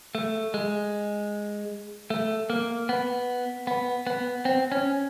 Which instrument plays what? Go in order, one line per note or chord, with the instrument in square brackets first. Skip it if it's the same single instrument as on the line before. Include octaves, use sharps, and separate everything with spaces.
[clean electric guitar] A3
G#3
A3
A#3
B3
B3
B3
C4
C#4